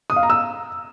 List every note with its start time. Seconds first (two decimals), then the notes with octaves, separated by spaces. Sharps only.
0.10 D#6
0.16 F5
0.23 A#5
0.30 E6